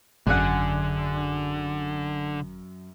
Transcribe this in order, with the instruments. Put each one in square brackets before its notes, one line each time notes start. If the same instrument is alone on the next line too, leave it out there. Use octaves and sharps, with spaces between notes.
[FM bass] G#1 [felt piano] F#2 [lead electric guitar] D3 [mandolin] D4 G#4 F#5